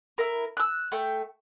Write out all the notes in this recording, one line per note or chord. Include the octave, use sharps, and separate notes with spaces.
E4 A#4
E6 F#6
A3 G5